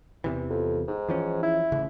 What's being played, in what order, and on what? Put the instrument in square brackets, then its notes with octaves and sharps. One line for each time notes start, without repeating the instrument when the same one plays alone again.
[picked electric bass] E2 C3 E3
[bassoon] F2
G#2
[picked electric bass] E3 F3 C#4
[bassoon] E4
[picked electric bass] A1 C#3